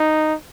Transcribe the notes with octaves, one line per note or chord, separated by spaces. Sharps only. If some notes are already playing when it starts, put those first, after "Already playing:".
Already playing: D#4